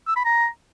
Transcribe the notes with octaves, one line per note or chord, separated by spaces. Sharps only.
E6
B5
A#5